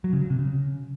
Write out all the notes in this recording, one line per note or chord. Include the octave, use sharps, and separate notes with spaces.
F#3
C#3
F#3
C3
C#3